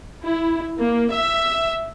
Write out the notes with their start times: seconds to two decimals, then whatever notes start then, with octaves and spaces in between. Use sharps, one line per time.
0.24 E4
0.79 A#3
1.14 E5